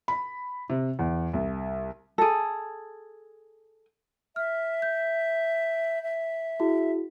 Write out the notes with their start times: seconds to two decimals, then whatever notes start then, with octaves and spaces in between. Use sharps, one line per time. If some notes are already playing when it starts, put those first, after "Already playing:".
0.08 B5
0.70 C3
0.99 E2
1.33 C2
2.18 G#4 A4
4.36 E5 F6
4.82 G6
6.03 E5
6.60 E4 F#4 G#4